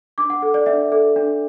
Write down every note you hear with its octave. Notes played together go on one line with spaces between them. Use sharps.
D4 D6
F#5
A4
D5
D4 E5
A4
D4